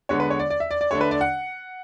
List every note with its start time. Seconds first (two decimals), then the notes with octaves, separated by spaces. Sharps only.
0.09 D3 G#3 B3 D4 C#5
0.20 B4
0.30 C#5
0.39 D5
0.50 D5
0.60 E5
0.71 D5
0.81 D5
0.91 D3 A3 D4 C#5
1.01 B4
1.11 D5
1.21 F#5